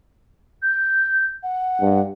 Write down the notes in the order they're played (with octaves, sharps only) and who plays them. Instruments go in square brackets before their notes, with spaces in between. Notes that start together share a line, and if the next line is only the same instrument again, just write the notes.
[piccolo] G6
F#5
[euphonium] G2